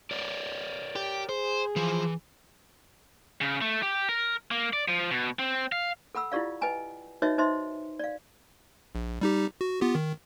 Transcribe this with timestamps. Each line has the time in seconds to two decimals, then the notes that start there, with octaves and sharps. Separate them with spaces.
0.11 A#4 C#5 D5
0.96 G4
1.29 G#4 C5
1.76 E3 F3
3.41 C#3
3.61 A3
3.82 G4
4.09 A#4
4.51 A#3
4.73 D5
4.88 F3
5.11 B2
5.39 C4
5.72 F5
6.15 A4 F#5 B5 E6
6.32 E4 F4 G4 D5 F5
6.61 B4 D#5 G5 G#5 A#5
7.22 D#4 F#4 B4 C#5 D#5 E5
7.38 D#4 C5 D#5 E5 C6
7.99 D5 F5
8.95 A#1
9.21 G3 D#4 G4
9.61 F#4
9.81 B3 F4 G4
9.95 D#3